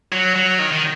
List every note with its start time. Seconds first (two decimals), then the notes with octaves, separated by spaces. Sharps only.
0.12 F#3
0.35 F#3
0.59 D#3
0.72 D#3